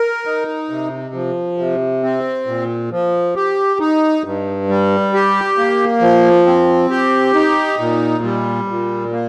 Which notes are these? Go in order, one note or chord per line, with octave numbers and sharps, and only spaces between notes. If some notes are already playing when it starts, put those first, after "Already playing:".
Already playing: A#4
D#4
C3
F3
C3
C4
A#2
F3
G4
D#4
G2
G3
G4
A#3
F3
C4
G4
D#4
A#2
G3
A#2
A#3